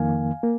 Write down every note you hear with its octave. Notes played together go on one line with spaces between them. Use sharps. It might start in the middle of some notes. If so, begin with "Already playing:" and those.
Already playing: F2 D#3 A#3 F5 G#5
A#3